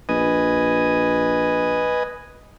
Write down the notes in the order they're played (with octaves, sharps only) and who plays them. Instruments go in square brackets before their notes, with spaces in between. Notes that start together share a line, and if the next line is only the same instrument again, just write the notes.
[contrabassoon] A#1 [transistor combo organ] B4 D#5 G#5